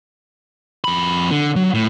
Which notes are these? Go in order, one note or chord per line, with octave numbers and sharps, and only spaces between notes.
F2 B5
D3
F#3
A2